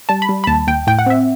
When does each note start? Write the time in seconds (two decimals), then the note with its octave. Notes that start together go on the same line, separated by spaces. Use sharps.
0.09 G3 A5
0.22 B5
0.29 G3
0.44 B5
0.47 D#2 A5
0.67 D#2 G5
0.87 A2 G5
0.99 F#5
1.06 C4 E5